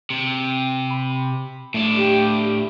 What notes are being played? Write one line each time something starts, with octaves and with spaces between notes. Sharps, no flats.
C3
B5
A2 A3 D4
A3 G4